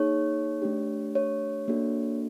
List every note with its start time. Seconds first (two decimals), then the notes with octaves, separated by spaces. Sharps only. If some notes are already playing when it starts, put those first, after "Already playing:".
Already playing: A#3 D#4 G#4 C#5
0.62 A3 D4 G4
1.15 C#5
1.68 A#3 D4 F#4 A4